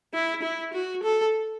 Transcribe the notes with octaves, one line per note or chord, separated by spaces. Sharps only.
E4
E4
F#4
A4